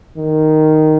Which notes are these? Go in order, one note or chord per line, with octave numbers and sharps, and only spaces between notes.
D#3